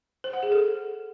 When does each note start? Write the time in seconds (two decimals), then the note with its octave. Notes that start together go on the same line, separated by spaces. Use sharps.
0.24 C5
0.33 F#5
0.43 G#4
0.52 A4